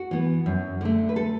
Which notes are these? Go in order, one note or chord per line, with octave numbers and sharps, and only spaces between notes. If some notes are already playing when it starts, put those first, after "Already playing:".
Already playing: F#4
E3 B3
F#2
D3 A3
B4
A4